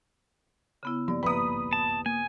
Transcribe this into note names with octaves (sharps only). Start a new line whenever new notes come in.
C#3 B3 E4
G2 F3 A#3 D5
D#1 G#1 F3 A#3 B4 B5 D#6
A5
A#3 G#5